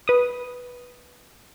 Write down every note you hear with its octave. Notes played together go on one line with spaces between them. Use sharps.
B4 D#6